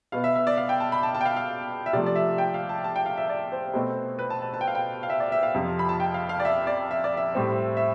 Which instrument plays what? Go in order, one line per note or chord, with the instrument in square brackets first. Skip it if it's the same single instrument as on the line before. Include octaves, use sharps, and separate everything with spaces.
[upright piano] B2 B3 F5
E5
E5
D5
F5
G5
A5
B5
A5
A5
G5
F5
F5
E5
C3 F3 A3 D5
D5
E5
G5
F5
A5
A5
G5
F5
E5
D5
C5
B2 A3 C4
B4
A5
A5
A5
G5
F5
G5
F5
E5
D5
E5
F5
F2 C3 F3
B5
A5
G5
F5
F5
D5
E5
D5
E5
D5
E5
A2 G3 C4
E5